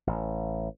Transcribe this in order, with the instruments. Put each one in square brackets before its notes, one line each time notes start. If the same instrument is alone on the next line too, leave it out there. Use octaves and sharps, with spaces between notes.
[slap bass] A1